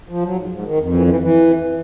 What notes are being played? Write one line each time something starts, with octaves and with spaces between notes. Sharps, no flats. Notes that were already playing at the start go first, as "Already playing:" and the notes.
F3
F#3
G#2
G#2
D#3
F2
E3
E3
E3